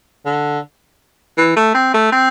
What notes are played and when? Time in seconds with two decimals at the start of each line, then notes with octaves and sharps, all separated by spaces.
0.26 D3
1.37 E3
1.56 A3
1.75 C4
1.94 A3
2.12 C4